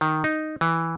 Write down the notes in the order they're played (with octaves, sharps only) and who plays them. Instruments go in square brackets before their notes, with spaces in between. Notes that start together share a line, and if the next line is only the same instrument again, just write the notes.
[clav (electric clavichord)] D#3
D#4
E3